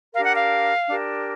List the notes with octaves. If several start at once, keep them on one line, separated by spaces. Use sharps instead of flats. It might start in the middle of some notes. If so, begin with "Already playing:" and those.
D4 G4 A#4 F5
F#5
F5
D4 G4 A#4